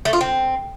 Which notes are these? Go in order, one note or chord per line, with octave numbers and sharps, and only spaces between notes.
A3
F4
C4